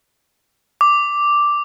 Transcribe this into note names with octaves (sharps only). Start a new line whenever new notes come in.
D6